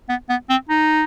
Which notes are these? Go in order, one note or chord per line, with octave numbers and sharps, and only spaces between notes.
B3
B3
C4
D#4